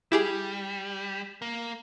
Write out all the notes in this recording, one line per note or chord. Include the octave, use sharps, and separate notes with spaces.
G3 E4 G4 G#4
A#3